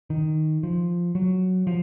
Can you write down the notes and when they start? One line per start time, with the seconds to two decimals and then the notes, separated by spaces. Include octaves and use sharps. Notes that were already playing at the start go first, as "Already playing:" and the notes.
0.10 D#3
0.63 F3
1.15 F#3
1.67 F3